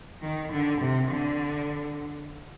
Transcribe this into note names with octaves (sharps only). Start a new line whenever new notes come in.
D#3
D3
C3
D3